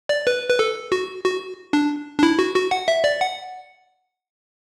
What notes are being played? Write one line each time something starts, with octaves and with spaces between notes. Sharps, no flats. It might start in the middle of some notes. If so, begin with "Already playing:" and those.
D5
B4
B4
A4
F#4
F#4
D4
D4
E4
F#4
F#4
F#5
E5
D5
F#5